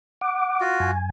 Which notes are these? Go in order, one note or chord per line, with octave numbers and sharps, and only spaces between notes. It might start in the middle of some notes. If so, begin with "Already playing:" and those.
F#5 D6
F4 F#4
F#2 G#5